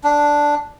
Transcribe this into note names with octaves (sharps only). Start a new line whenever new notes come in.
D4